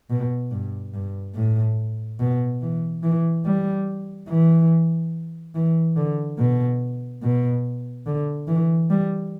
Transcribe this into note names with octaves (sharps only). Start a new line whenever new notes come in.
B2
G2
G2
A2
B2
E3
E3
G3
E3
E3
D3
B2
B2
D3
E3
G3